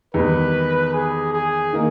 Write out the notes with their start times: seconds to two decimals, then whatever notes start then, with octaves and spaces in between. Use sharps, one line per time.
0.14 E2 D#3 G3 B4
0.93 G#4
1.33 G#4
1.73 D#3 A#3